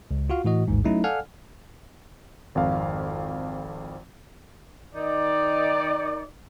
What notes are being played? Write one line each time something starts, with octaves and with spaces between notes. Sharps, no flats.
C#2
F4 F#4 F5
A2 E3 F#4 D#5
A1 D#2 G#2
F#3 A3 C#4 D#4 E4
A4 D5 F5 F#5 G#5 F6
G#1 F2 F5
D#3 D#4 D5